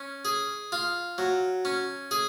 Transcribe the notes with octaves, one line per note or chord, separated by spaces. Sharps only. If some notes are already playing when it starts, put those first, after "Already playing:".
Already playing: C#4
G#4
F4
F#3
C#4
G#4